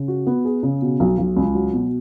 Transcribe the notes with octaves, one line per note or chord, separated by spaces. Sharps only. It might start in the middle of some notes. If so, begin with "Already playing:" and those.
Already playing: C#3
F#4
B3
G#4
C#3
B2
B1
B1
C#2
F#3
B2